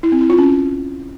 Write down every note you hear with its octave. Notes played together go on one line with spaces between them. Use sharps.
E4
C4
E4
F4
C#4